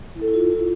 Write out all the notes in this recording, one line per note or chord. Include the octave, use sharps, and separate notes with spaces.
E4
A4
E4
F4